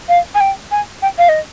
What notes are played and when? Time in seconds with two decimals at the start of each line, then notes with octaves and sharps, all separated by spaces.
0.09 F5
0.35 G#5
0.40 G5
0.72 G#5
1.02 G5
1.18 F5
1.29 D#5